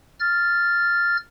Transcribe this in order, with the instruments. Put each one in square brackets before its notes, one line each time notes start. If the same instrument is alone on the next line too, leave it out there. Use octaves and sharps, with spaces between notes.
[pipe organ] F6 A6